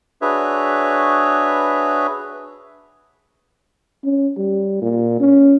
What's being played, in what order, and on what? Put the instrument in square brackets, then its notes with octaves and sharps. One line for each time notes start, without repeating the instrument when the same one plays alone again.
[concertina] D4 F#4 G#4 B4 C#5 E5
[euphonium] C#4
G3
A#2
C#4